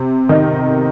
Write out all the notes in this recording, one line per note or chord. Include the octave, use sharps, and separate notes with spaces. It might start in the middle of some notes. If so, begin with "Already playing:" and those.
Already playing: C3
D#3 D#4